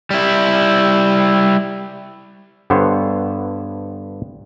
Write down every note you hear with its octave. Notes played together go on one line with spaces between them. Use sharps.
G3 E4
G2 D3 B3 C5 C#5